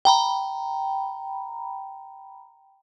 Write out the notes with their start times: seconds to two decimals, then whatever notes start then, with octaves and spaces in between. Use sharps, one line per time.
0.05 G5 A#5 B5